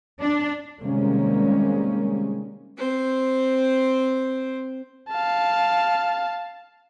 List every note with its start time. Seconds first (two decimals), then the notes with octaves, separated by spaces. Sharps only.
0.20 D4
0.81 C3 D#3 G3 G#3 A#3 C#4
2.78 C4 C5
5.09 F5 A5